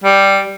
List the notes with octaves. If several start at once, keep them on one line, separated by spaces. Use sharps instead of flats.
G3